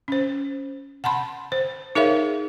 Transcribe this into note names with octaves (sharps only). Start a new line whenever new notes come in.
C#4 C5
F#5 A5 B5 C6
C5
D#4 G#4 A#4 C#5 E5 F5